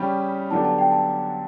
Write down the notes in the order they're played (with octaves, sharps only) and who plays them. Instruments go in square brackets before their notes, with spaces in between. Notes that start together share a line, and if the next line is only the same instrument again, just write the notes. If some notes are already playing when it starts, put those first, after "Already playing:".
Already playing: [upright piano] C#3 G3 C#4 G4 [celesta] B5
[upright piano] D3 F#3 B3 D4 G4 [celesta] A5
[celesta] A5
G5
A5